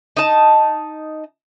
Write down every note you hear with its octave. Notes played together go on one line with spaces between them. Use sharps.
D#4 A5